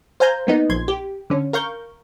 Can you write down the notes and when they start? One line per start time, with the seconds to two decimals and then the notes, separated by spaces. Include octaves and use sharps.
0.20 C5 F5 G#5 A#5 G6
0.47 A#3 B3 D#4
0.69 A#1 C6 G#6
0.88 G4
1.30 D3 C#4
1.53 A#4 F5 C#6 G6